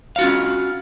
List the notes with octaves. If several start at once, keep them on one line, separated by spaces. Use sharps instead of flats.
C#4 F4 F#4 F5